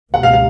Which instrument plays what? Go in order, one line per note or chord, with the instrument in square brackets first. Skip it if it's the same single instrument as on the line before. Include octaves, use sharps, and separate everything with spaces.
[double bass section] C#2 B2 G3 [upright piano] F#5
[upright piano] F5
F5